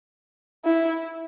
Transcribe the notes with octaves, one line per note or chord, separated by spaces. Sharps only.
E4